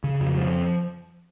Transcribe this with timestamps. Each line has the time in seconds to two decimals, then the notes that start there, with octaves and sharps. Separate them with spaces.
0.04 C#3
0.21 F2
0.38 F3